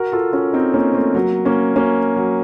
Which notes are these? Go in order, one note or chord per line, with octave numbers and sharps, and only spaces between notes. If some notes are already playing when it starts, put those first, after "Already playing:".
Already playing: F#4 A#4
F4 A4
C#4 F4
C4 D#4
A#3 C#4
A3 C4
F#3 A#3
A#3 C#4
A#3 C#4
F#3